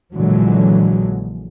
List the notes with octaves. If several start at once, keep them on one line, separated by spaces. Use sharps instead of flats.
A#1 A#2 D3 E3 F#3 G#3